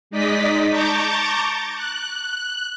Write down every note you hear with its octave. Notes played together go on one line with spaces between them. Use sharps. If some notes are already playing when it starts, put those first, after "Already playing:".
G#3 D#4 D5 D#5 B6
A5 A#5 C#6 D6 G6 A6
F#6